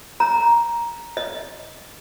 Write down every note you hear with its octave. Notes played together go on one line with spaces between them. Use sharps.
A#5
D#5